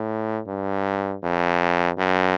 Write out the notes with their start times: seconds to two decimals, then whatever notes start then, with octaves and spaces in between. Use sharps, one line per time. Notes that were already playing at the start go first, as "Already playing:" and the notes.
Already playing: A2
0.47 G2
1.23 F2
1.98 F#2